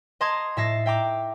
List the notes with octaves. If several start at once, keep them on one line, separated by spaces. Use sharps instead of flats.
D#5 A5 A#5 C6 D#6 G#6
A2 E5 A5 A#6 C7
E5 G5 A#5 D6